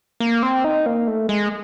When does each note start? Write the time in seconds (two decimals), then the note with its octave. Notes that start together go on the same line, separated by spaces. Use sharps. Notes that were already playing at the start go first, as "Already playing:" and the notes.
0.20 A#3
0.43 C4
0.64 D#4
0.86 A#3
1.08 A3
1.29 G#3